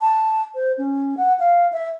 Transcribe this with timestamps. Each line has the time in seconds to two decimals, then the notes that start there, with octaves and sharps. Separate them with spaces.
0.01 A5
0.55 C5
0.78 C#4
1.17 F#5
1.40 F5
1.73 E5